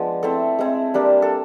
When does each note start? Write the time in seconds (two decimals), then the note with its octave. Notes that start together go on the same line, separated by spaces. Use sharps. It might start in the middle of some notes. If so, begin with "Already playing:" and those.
Already playing: F3 G#3 B3 D4
0.23 A3 C4 E4 A4
0.59 G#3 C4 E4
0.94 G3 A#3 D4
1.22 A4